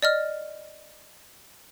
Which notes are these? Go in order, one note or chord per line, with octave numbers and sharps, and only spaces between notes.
D5 D#5 F6